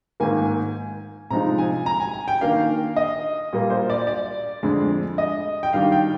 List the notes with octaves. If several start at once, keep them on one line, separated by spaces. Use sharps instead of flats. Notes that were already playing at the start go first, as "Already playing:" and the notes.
G#2 D#3 A#3 G#5
C3 F3 G#3 D#4 A#5
G#5
A#5
G#5
G#5
G5
D#3 A#3 D4 F5
D#5
A#2 G3 A#3
C5
D5
D5
F2 D3 G#3
D#5
G5
D#3 G3 D4 F5
G5